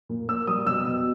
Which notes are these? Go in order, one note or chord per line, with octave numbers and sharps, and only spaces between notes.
A#2
A#3 E6
G3 D#6
B2 E6
B2